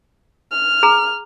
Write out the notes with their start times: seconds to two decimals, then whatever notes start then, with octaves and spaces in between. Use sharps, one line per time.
0.52 F6
0.83 G#4 A#5